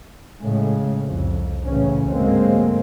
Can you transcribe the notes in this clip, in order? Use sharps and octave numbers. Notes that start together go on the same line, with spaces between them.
A2 C#3 G#3
C2 F2
A1 C#3 C#4
D2 G#2 F#3 G#3 A#3 C4